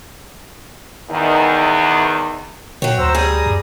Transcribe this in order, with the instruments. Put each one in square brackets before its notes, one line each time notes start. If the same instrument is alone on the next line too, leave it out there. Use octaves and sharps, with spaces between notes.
[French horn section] E2 D#3
[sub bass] A#2 [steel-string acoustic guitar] F#3 C#5 [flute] G5
[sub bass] D2 [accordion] C5 E6 [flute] A#5
[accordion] G3 D#6 [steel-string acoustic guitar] G#4
[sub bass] F#2